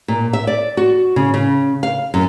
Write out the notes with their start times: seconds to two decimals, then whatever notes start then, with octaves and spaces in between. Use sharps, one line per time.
0.08 A#2
0.33 E5
0.47 D5
0.77 F#4
1.16 C#3
1.34 C#3
1.83 F5
2.14 F#2